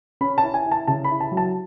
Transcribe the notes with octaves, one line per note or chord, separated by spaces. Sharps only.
C#4 B5
A5
E4
G#5
E4
A5
C#3 A5
B5
E4
A5
F#3
A5